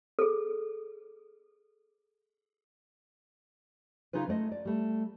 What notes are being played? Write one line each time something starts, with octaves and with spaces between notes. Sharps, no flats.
G#4 A4
C#3 E3 D#4 F4 G#4 B4
G#3 A3 D5 D#5
D5
G3 A3